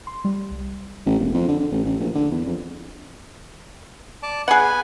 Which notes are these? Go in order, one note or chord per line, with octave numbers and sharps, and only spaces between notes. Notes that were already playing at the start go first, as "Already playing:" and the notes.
C6
G3
C2
A1
E1
F2
D3
D3
A1
A1
A#1
D3
E2
F2
D5 A5 D6
B3 G#4 B4 F#5 G#5